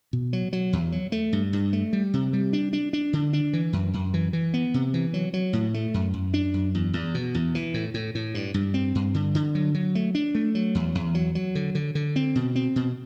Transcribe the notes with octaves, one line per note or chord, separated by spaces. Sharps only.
B2
F#3
F#3
E2
F#3
A3
G2
G2
A3
G3
C3
G3
D4
D4
D4
D3
D4
E3
F#2
F#2
E3
E3
B3
C3
E3
F#3
F#3
A2
A3
F#2
F#2
D4
F#2
E2
E2
B2
E2
E3
A2
A2
A2
G2
G2
C4
G2
D3
D3
F#3
F#3
A3
D4
A3
F#3
E2
E2
F#3
F#3
D3
D3
D3
C4
B2
C4
B2